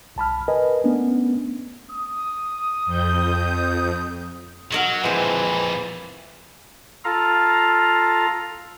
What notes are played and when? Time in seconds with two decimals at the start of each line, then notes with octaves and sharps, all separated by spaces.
0.16 C2 A5 B5 F6
0.48 A#4 B4 D#5 G#5
0.84 A3 B3 C#4 D4
1.89 D#6
2.86 F2 G6
4.72 F#3 F#4 A#4 D#5
5.04 F2 A#2 E3 G#3 C4
7.05 F4 A4 F5 A#5